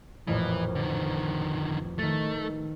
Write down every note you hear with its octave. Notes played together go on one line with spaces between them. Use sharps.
A1 F2 A#2 E3
D3 D#3
D#3 A3 A6